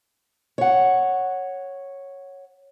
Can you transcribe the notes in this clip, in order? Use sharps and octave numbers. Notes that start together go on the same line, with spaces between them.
C#5 F#5